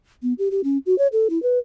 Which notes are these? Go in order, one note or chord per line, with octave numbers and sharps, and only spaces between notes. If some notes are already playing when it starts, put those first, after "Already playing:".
B3
G4
G4
C#4
F#4
C#5
A4
E4
B4